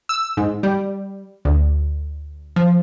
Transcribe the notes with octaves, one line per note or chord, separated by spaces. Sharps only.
E6
G#2
G3
D2
F3